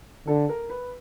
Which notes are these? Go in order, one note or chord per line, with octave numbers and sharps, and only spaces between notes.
D3 A4
A#4
B4